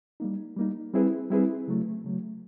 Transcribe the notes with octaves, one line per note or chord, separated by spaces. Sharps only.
G3 A#3 D#4
G3 A#3 D#4
G3 C4 E4 G#4 B4
G3 C4 E4 G#4 B4
C#3 F#3 A3
C#3 F#3 A3